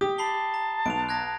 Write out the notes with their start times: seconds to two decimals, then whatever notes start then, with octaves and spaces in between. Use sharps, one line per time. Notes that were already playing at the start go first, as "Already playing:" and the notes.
0.01 G4 D#6
0.18 A5 B5 C7 G7
0.54 A#5
0.86 B1 D7 F7
1.09 F#6 G#6 A#6